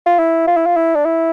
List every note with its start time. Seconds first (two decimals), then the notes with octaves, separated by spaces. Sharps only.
0.06 F4
0.19 E4
0.47 F4
0.57 E4
0.66 F4
0.76 E4
0.95 D4
1.05 E4